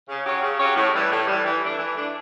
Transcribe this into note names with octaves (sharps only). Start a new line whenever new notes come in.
C#3
F#3 C#4 G4 C#5
C#3
F#3 C#4 G4 C#5
A2
E3 G3
A2
E3 G3
E3
A3 D4
E3
A3 D4